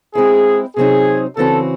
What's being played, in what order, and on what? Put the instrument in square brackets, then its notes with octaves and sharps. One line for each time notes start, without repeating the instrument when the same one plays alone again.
[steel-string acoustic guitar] G#3 C4 E4 [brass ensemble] G#4
[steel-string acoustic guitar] C3 F#3 C4 D#4 [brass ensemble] G#4
[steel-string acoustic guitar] C#3 E3 C4 F#4 [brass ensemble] A4